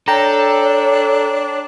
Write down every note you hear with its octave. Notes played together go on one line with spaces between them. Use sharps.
D4 A4 C#5 G5 A#5